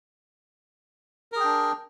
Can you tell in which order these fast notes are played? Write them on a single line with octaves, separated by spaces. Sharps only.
A#4 G#4 G5 D4